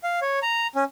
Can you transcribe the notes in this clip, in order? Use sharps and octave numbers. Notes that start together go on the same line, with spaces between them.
F5
C#5
A#5
C#4